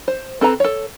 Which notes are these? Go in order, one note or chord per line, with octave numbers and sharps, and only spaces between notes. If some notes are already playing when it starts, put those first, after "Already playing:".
C5
C4 A4 B4 A#5
A4 C#5